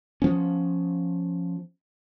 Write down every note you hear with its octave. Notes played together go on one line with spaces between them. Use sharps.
F3 B3 C#4